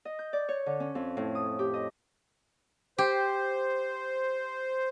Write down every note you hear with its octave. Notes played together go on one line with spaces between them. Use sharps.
D#5
G6
D5
C#5
D3
C#4
F2
A2
D#6
G4
D#5
G4 C5